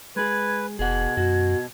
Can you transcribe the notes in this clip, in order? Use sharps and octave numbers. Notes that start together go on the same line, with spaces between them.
G#3 G#4 B4 G#6
F1 B2 G#4 F#5 G#6
F#2 F#4